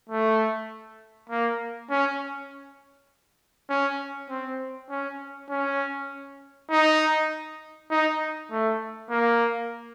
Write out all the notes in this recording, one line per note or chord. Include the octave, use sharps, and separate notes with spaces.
A3
A#3
C#4
C#4
C4
C#4
C#4
D#4
D#4
A3
A#3